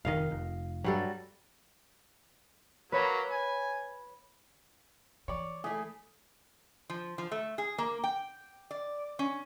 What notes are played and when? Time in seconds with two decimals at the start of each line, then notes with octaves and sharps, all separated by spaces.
0.05 F1 G#2 D#3 D#5 F5
0.31 F1
0.84 G2 F#3 G3 A4
2.92 F#3 A#3 B4 C#5 B5
3.31 G#5
5.28 E3 C#5 D5
5.64 A3 E4 G#4
6.90 F3
7.18 F3
7.31 A3
7.58 G#4
7.78 A#3
8.04 G5
8.71 D5
9.19 C#4